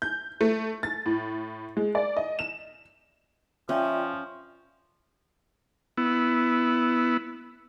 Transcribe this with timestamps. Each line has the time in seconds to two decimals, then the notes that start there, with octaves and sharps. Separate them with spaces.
0.02 G6
0.41 A3
0.83 A6
1.06 A2
1.77 G#3
1.95 D5
2.17 D#5
2.39 E7
3.69 F3 C#4 F4 D5 E5 G5
5.97 B3 E4